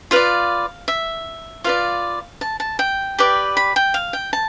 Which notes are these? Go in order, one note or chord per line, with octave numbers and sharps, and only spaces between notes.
F4 B4 D5 F5
E5
F4 B4 D5 F5
A5
A5
G5
G4 B4 D5
B5
G5
F5
G5
A5